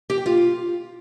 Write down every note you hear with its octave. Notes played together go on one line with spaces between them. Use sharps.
G4
G5
F4